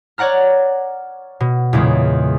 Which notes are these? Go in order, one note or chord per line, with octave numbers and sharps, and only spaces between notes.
C#5 D5 F#5 A#5 F6
B2
E2 A#2 C#3 G#3